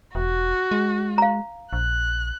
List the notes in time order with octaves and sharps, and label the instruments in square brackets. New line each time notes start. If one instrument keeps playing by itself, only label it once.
[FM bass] E1 [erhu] F#4
[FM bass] G#3
[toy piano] F5 A#5
[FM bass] A#1 [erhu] F#6